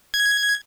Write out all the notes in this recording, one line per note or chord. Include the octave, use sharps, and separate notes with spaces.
G#6